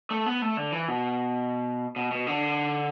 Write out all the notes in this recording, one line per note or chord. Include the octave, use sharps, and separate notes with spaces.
A3
B3
A3
D3
E3
B2
B2
B2
D3